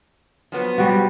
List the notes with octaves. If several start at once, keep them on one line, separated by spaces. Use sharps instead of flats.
F3 F#3 B3
G3 F#4